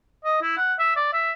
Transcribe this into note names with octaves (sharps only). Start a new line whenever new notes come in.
D#5
E4
F#5
E5
D5
E5